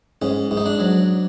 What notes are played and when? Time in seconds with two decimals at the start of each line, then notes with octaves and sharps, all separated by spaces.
0.22 G#2 C#4
0.51 G#2
0.57 D#4
0.66 D4
0.80 F#3